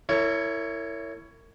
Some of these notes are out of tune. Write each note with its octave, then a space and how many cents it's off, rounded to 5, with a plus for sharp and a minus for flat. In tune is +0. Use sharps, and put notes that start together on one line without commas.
E4 +0 A#4 -35 C#5 +15